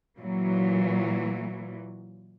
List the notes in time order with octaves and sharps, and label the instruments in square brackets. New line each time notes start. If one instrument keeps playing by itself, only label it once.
[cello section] A#2 E3 F#3